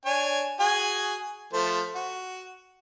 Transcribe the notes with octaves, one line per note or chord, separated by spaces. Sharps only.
D4 C#5 G#5
F#4 G#4 G#5
F3 A3 C5
F#4